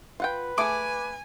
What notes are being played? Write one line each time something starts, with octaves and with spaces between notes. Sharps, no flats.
F4 B4 F#5 G5
A3 G#4 G#5 D6